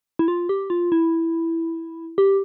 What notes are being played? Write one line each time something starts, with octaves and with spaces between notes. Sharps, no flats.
E4
F4
G4
F4
E4
G4